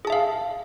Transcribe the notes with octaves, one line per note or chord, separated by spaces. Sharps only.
G#4 E5 F5 A5